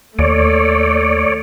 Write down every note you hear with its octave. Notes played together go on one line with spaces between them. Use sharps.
D#2 A3 C#5 D5